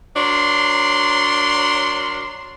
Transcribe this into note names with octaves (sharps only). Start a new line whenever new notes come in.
F#3 D4 A#4 C6